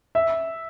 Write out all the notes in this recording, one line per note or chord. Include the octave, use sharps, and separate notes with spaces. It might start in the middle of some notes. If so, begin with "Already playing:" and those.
E5